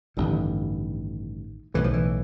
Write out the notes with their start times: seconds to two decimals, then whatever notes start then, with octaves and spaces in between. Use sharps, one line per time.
0.17 A1 G2 D3 D#3
1.74 B1 A2 E3
1.84 F3
1.94 E3